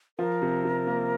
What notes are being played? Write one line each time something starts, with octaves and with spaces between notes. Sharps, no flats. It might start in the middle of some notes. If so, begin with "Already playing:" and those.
F3 A#4
C3
C3
A#3